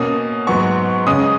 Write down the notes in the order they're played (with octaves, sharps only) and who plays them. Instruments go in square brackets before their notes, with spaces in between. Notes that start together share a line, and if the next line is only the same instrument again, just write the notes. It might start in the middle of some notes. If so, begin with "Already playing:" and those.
Already playing: [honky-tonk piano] B2 A#3 C#4 D#6
G#2 F#3 B3 C#6
C#3 G#3 C#4 D#6